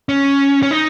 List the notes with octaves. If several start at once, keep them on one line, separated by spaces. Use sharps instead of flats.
C#4
C#4
D#4